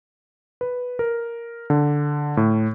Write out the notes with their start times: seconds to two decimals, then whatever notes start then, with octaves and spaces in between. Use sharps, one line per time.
0.61 B4
0.99 A#4
1.70 D3
2.37 A2